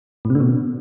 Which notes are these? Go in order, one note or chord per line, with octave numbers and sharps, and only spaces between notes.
A2
C3
D3
B2